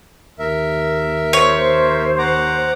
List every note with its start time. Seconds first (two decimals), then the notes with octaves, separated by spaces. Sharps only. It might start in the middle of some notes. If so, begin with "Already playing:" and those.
0.39 D#2 A#4 E5
1.33 C5 C#5
2.18 F#5 A#5 D6